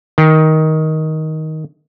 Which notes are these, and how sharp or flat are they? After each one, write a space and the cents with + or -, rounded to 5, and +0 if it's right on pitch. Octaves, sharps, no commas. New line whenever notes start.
D#3 +10